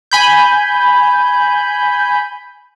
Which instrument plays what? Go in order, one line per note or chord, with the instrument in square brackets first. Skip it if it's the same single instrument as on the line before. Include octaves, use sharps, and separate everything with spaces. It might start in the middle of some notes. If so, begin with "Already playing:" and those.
[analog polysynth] G#5 B5 G6